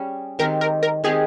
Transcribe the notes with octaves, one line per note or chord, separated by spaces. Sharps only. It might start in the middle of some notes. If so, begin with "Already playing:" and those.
Already playing: G3 C#4 G#4
D#3 G#3 C4 G4 A#4
A#4
A#4
D#3 G#3 C4 G4 G#4